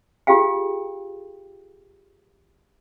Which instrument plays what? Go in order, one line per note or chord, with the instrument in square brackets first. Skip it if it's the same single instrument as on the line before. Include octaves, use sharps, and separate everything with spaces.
[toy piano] F4 G4 G#4 F5 G5